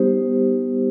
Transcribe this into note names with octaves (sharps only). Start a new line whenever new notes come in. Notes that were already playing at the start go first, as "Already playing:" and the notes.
Already playing: G3 B3 D#4 G4 C5